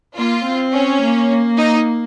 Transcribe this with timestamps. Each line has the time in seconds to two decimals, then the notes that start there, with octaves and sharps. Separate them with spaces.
0.16 A#3 F4
0.45 C4
0.73 C#4
1.02 A#3
1.57 D#4